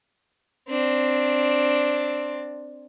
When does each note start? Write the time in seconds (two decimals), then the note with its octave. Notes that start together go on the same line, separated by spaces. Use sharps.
0.69 C4 D4